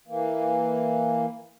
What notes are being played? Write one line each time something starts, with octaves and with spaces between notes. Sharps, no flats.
E3 A#3